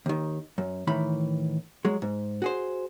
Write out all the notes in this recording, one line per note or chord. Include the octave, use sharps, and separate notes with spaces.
D#2 D#3
F#2
A2 D#3 E3 B5
F#3 G#3
G#2
F#4 G#4 C5